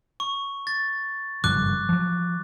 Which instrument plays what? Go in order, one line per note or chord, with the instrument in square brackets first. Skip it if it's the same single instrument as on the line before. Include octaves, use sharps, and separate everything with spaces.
[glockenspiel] C#6
A6
[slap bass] F#1 G2 F3 [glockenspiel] D6 F#6
[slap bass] F3 F#3